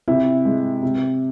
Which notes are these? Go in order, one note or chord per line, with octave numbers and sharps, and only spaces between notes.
C3 E4
G#3
C3